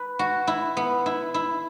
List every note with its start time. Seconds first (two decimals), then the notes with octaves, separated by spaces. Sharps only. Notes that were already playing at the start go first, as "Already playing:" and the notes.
Already playing: B4
0.19 F#4
0.47 E4
0.77 B3
1.06 E4
1.34 E4